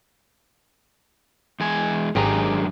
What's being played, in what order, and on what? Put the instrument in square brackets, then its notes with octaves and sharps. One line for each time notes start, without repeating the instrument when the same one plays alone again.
[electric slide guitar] E2 G#3 G#5
[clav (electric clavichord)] G#1 G4 G#4 [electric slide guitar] F#2 D4 A#5